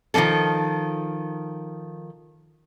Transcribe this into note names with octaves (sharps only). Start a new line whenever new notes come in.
D#3 F3 A3 A#3 A4